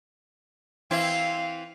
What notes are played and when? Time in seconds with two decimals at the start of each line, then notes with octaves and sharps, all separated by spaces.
0.91 E3 C4 E4 F5